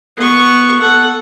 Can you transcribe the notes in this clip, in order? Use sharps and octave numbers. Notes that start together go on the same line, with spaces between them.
B3 C#6
A4 F#5